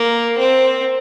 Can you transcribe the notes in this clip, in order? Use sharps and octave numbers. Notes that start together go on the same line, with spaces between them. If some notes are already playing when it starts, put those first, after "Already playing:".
Already playing: A#3
C4